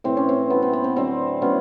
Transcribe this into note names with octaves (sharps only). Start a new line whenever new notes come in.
A2 E3 A3 C4
C#4
C4
A2 F#3 A3 B3
C4
B3
C4
D3 F#3 A3 C4
A2 F#3 A3 B3 C#4